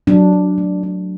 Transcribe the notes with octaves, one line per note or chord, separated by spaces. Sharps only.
F#3 D4
F#3
A3
D4